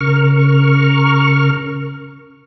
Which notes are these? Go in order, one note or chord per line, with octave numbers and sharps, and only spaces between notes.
C#3 A#4 C#6 F6